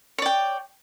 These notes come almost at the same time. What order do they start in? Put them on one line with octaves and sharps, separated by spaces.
C#5 D5 G5